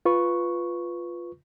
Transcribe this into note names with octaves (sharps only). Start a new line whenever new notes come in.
F4 B4 C#6